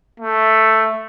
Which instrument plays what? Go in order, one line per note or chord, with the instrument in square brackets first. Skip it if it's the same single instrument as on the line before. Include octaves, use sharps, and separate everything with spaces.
[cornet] A3